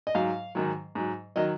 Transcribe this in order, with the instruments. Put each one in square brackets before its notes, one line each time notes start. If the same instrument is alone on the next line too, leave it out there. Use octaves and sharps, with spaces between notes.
[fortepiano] D#5
G#2 F#3 F5
G#2 D#3 F#3
G#2 F#3
D#3 F#3 D#5